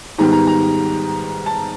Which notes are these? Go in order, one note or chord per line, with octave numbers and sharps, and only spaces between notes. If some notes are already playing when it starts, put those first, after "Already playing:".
G#2 D#3 G3 B3 A#5
A#5
A#5
A5